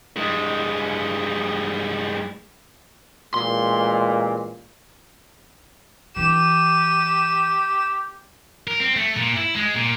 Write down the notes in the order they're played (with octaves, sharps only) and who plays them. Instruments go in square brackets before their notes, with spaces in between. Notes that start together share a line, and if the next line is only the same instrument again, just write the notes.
[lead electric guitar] G2 G#3
[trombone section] A1 A#2 G#3 [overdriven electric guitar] C6
[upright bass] E3 D4 [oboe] G4 [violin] D#7 E7
[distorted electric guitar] A#4
C4
A3
A#2
E4
G#3
A#2